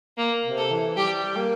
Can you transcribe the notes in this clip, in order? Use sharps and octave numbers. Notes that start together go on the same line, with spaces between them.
A#3
C3
A4
E3
G3 G4
A#3